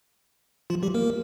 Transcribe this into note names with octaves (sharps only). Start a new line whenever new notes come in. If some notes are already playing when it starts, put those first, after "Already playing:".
F3 F4
G3 G4
A#3 A#4